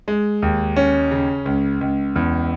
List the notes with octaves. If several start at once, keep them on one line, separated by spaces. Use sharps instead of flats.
G#3
D#2
C#4
C#3
C#2
C#2
E2